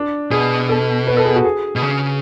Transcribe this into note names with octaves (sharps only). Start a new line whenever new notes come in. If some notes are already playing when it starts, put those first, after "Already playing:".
Already playing: D4
B2 G#4
A4
B4
A4
G#4
F#4
G#4
B2
C#3